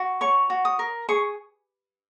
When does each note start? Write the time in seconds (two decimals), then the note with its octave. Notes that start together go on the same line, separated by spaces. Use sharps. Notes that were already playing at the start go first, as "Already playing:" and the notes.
Already playing: F#4
0.21 C#5 C#6
0.50 F#4
0.65 D#6
0.79 A#4
1.09 G#4 C#6